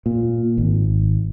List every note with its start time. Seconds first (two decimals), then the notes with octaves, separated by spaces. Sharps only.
0.06 A#2
0.58 G#1